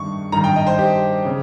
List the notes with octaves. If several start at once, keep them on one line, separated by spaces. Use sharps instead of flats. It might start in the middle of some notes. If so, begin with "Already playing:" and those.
Already playing: G2 D#3 C#6
G2 D#3 A#5
G5
D#5
C5
G4
C#3